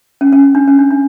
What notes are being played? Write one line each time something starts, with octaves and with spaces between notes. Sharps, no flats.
C#4
C#4
D4
C#4
D4
D4